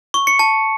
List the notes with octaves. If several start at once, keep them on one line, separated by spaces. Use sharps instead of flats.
C#6
C#7
A5